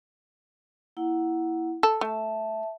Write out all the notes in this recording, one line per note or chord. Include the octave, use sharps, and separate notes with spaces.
A#3 E4 F#5
A4
A3 E5 A5